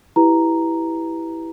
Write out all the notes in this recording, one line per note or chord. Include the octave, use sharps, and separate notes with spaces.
E4 G4 B4 A#5